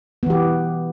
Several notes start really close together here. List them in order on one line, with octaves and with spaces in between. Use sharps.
B3 E3 G4